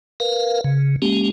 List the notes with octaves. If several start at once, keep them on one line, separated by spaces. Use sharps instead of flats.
A#4 B4 F5
C#3
G#3 A#3 C#4 G4